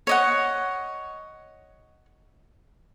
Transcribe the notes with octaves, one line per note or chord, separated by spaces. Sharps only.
C#5 D#5 F#5